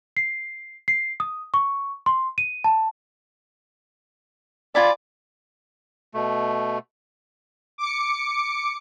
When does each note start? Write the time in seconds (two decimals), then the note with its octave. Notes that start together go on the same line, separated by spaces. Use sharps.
0.17 C7
0.88 C7
1.20 D#6
1.54 C#6
2.06 C6
2.38 D#7
2.64 A5
4.75 F4 D5 G#5 B5
6.14 B2 A3
7.78 D6 C#7